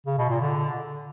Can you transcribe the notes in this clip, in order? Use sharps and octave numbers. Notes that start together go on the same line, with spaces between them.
C#3
B2
A#2
D3